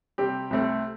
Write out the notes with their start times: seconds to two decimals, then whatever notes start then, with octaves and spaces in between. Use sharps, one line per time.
0.18 C3 G3 C4 G4
0.50 C2 C3 A3 C4